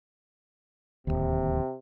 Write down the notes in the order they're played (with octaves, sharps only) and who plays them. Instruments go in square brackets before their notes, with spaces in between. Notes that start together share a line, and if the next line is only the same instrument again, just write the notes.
[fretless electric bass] D1 G1 D#2 [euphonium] C3